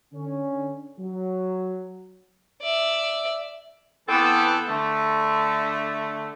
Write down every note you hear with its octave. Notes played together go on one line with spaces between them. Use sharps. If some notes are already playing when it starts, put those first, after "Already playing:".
D3 C#4
F#3
D5 E5
E3 B3 C4 A4
D3 A3